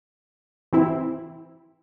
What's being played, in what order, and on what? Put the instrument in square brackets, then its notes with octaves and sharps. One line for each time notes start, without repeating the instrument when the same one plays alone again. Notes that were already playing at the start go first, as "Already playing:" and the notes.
[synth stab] E3 C4 E4